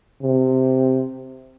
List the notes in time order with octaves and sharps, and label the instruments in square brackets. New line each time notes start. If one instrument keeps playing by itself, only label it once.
[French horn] C3